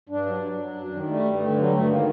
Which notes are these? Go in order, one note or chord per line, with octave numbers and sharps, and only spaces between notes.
G2 D4
F#3
F#3
F#3
F#2
D#3
G3 A3
G2
A3
D3
F#3 G3
G2 A3
D#3 A#3